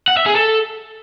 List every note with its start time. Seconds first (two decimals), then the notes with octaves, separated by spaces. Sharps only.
0.08 F#5
0.17 E5
0.26 G#4
0.35 A4